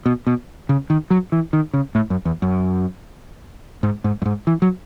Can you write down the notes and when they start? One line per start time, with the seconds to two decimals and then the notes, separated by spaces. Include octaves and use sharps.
0.06 B2
0.27 B2
0.69 C#3
0.90 D#3
1.10 F#3
1.32 E3
1.53 D#3
1.74 C#3
1.95 A2
2.10 F#2
2.25 E2
2.42 F#2
3.83 G#2
4.04 G#2
4.22 F#2
4.26 G#2
4.47 E3
4.62 F#3